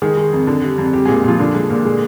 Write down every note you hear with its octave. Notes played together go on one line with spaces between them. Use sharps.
D#3 G#3 G#4
G#3
F2
D3
G3
F2
G3 G4
G#3 G#4
A#2
A#2 F3 F4
D3 F3 D4
G#3
A#2
G#3